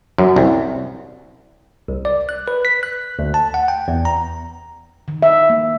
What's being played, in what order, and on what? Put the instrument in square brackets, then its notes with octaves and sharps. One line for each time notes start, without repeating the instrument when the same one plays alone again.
[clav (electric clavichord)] F#2
C2
[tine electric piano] C2
D5
F#6
B4
B6
F#6
D2
A5
F#5
G5
E2
A#5
[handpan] D#3
E5
A#3